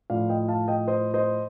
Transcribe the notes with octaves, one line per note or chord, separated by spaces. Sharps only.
A2 F3 D5 F5
D#5 G5
F5 A5
D#5 G5
C5 D#5
C5 D#5